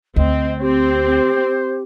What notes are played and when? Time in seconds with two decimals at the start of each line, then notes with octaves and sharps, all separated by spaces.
0.16 D2 C4 D#5
0.61 C4 G4 C5